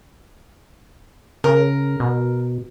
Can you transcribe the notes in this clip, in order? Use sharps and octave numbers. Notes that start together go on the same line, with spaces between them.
C#3 A#4
B2